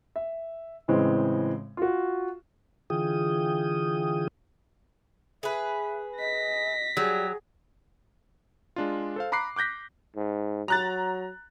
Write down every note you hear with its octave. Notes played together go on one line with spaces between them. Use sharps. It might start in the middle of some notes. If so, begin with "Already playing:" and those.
E5
A2 C#3 E3 G#3 C4
F4 F#4
D3 E3 F4 G#4 G5 D#6
G#4 B4 E5
D#5 A#6 B6
F#3 G3 G#4
G#3 D4 F4
A4 C5 F5
A#5 B5 D6 F#6 C7
D6 F#6 G6 A#6 B6
G#2
F#3 A#5 F#6 A6